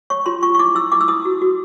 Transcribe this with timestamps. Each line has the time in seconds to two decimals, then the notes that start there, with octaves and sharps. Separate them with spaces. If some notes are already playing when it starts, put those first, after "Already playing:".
0.10 C#5 C#6
0.26 F4 C6
0.43 F4 C#6
0.55 C#6
0.59 E4 D6
0.75 E4 E6
0.92 E4 D6
1.01 E6
1.08 E4 D#6
1.25 F#4
1.42 F#4